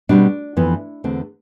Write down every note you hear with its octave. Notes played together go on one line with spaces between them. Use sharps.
B2 G3 C4 D4
F2 E3 B3
E2 D3 A3 C4